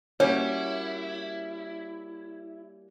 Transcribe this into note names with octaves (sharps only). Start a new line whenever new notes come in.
G3 A#3 C#4 E4 F#4 A#4 C#5